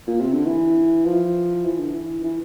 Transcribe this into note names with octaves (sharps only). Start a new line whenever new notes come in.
A#2
C3
D3
E3
F3
E3
D3
E3
E3